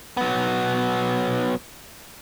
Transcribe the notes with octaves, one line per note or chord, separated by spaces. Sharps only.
F#3 B3